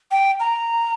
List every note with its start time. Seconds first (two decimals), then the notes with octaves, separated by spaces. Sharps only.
0.11 G5
0.40 A#5